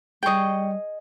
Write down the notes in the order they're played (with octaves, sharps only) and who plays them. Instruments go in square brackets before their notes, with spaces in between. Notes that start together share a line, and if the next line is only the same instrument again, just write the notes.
[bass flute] G3 [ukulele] G#4 D#5 [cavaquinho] G5 C#6